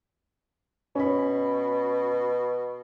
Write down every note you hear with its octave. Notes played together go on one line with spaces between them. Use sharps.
B2 C#4 B5